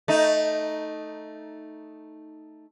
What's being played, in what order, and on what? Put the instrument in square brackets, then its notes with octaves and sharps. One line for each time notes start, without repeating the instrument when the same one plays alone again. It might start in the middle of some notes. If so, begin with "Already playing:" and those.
[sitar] A3 D#4